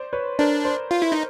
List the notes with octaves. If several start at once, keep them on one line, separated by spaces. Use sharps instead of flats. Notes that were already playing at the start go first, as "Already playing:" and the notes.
Already playing: C5 D5
B4 C#5
D4 A#4 C5
C5 D5
F4
E4
D#4